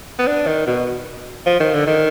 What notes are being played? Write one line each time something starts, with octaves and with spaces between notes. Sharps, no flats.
B3
D4
D#3
B2
F3
D#3
D3
D#3